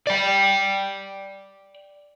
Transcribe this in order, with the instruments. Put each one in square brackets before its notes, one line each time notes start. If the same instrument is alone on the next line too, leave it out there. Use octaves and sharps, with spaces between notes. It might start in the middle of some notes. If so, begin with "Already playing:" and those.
[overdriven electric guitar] D5 G5